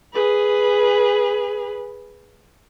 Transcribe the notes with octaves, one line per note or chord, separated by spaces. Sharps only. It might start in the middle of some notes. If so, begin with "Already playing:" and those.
G#4 B4